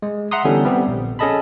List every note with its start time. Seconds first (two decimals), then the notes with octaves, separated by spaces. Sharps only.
0.02 G#3
0.31 E5 F#5 A#5 C6 D#6
0.45 D3 E3 G3 B3 C#4 A4
0.65 G3 B3 C4 G4
0.88 A#1
1.19 C#4 G#4 A4 D#5 A5 B5